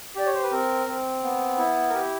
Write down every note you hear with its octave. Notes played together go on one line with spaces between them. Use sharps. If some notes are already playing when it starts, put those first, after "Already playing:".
G4 D5
C#5
C5
B4
C4 A#4
C4
B3
E4
A#4
G4 B4